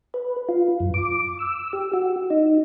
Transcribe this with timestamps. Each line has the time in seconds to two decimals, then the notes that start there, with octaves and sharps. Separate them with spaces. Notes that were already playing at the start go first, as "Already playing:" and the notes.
0.14 B4
0.49 F4
0.80 F#2
0.94 D6
1.39 E6
1.73 G4
1.93 F#4
2.30 D#4